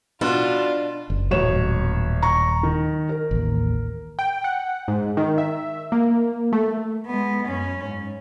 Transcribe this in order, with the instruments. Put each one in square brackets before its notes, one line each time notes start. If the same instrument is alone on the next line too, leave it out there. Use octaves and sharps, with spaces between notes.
[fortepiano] B2 [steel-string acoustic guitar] D4 [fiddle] F4
[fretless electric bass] F#1
[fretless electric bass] D#1 F#3 [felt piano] A1 C#5 E7
[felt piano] A#5 C#6
D#3
A#4
[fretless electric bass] A1 D#2
[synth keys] G5
F#5
G#2
D#3
E5
A#3
A3
[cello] G#3 B3
F#2 C#4
G#2